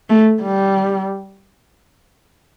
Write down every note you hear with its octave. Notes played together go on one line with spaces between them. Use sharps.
A3
G3